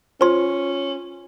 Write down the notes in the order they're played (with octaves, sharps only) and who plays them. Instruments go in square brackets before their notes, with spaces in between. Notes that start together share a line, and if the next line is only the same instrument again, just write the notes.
[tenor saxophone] C#4 [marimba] F4 [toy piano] C5 C6